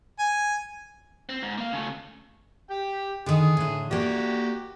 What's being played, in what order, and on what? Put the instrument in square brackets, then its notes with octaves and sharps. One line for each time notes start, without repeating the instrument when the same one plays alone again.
[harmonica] G#5
[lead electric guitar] C4
G#2
A#3 F5
C#3 A3
[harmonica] G4 G5
[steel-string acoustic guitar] D3 D#3 [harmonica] G#4
[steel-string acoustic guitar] A2 D3
[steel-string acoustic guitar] A#3 D5 [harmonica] F#4 G4